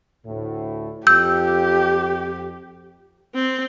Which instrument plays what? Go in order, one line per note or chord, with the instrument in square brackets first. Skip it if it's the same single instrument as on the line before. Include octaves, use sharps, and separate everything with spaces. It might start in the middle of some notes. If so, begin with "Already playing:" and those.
[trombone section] D2 A2
[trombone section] F2 [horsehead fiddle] G4 [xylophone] E6 G6
[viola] C4